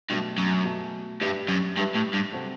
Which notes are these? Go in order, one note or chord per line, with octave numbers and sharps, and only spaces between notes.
G2 B2 F#3 A3
F#2
B2 F#3 A3
G2 G3 D4 G4 B4 E5
F#2
G2 G3 D4 G4 B4 E5
A2
G2
C3 F#3 C4 F#4 A4